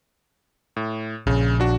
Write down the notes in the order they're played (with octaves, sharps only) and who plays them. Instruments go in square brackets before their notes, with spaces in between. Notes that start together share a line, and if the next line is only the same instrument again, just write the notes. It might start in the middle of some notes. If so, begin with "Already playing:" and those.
[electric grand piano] A2
[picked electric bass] A#1 [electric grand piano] C#3
[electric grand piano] D4 F#4